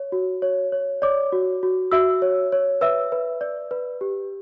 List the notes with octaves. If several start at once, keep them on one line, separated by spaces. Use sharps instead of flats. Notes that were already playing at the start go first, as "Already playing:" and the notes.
Already playing: C#5
F#4
C#5
C#5
C#5 D5 D6
F#4
F#4
F#4 E5 E6
C#5
C#5
B4 E5 E6
B4
D5
B4
G4